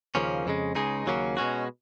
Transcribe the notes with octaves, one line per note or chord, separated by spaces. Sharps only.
D#2 C#3 F3 A#3 C#4
F2 C#3 G#3
C#2 C#3 G#3 D#4 G#4
D#2 C#3 F#3 A#3 C#4
B2 G#3 C#4 F#4